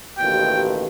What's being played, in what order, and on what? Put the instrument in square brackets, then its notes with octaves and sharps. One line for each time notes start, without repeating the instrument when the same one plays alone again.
[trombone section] A1 D#2 B2 [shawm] G5